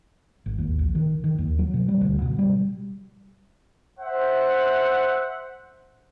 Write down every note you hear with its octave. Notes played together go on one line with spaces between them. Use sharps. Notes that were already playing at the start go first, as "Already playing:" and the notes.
G#1
D#2
A#1
D#3
D#3
D#2
F#3
B2
G3
D2
B2
G3
C5 E5 F#5